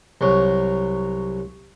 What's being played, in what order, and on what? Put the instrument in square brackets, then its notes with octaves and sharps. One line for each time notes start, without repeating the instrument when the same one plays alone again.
[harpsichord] C2 F#3